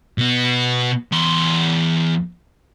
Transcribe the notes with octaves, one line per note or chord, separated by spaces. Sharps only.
B2 B3
E2 C6